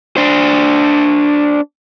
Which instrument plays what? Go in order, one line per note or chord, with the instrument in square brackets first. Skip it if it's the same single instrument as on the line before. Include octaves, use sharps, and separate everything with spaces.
[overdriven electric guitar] D4 C5